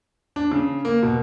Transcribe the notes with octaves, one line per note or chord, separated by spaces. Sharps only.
D4
C#3
A#3
B2